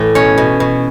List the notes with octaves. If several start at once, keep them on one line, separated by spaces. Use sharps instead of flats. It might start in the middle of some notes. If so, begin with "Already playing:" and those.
Already playing: A2 E3
B2 C#4 C#5
B2
B2